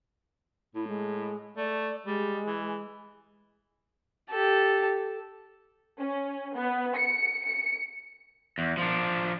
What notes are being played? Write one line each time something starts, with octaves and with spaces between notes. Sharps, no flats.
A2 E4
G#3
A3 D5
G3 G#3
E3
G4 A4
C#4
B3
C#7
C#7
E2
F3 D4